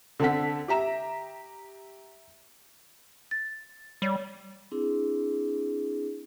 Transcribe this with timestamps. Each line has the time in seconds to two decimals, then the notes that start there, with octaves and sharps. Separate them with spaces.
0.20 D3 C4 A4 F#5 B6
0.68 G4 E5 A#5 E7
3.31 A6
4.02 G3 C#5
4.71 C4 D4 E4 G#4